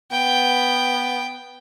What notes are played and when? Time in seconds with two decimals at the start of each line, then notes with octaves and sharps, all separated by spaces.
0.12 B3 G5